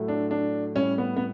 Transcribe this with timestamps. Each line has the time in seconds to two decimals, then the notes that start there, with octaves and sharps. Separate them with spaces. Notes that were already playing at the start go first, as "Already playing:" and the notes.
Already playing: A2 F#3 A3
0.08 D4
0.31 D4
0.75 A2 G3 C#4
0.98 B3
1.16 B3